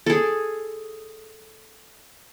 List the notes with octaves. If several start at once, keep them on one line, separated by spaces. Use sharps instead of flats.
G#4 A4